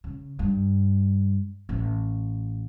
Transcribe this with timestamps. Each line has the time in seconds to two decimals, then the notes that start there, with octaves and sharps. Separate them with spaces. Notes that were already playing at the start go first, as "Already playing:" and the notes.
0.04 C#3
0.39 G2
1.69 A1